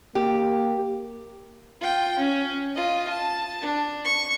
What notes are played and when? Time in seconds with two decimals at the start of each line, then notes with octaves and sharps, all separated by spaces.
0.15 A#3 G4
1.81 F4 G5
2.19 C#4
2.76 F4 D#5
3.09 A5
3.62 D4
4.04 C#6